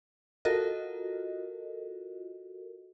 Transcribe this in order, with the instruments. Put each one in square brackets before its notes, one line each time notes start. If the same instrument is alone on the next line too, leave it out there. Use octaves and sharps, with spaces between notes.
[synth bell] F4 F#4 A4 A#4 D#5